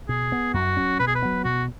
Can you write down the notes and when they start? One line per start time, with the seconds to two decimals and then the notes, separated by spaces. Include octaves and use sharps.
0.09 B2 G#4
0.32 B3
0.54 F#2 F#4
0.77 F#3 C#4
1.00 B2 B4
1.07 G#4
1.15 B4
1.22 F#3 B3
1.45 B2 F#4